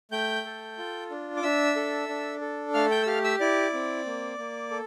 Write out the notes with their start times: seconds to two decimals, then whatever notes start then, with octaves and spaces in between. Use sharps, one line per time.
0.11 A3 G5 G6
0.45 A4
0.78 F4
1.10 D4
1.37 D6
1.43 D4 E5 E6
1.76 A4
2.09 D4
2.41 A4
2.74 A3 F5 F6
2.91 G5 G6
3.03 E6
3.07 G4 F5 F6
3.24 E5 E6
3.40 E4 D5 D6
3.73 C4
4.06 A#3
4.38 A#3
4.71 A4